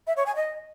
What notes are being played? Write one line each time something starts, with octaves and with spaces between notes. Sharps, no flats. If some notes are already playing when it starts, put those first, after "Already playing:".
E5
C#5
G#5
D#5